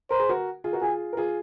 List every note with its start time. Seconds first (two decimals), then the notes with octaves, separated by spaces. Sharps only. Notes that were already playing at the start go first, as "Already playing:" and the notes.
0.11 A#4 C5
0.20 G#4
0.29 F#4 A#4
0.64 F4 G#4
0.73 F#4 A#4
0.82 F4 G#4 G#5
1.13 A#4
1.17 F4 G#4